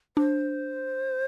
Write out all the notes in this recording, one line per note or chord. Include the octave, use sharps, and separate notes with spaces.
D4 C5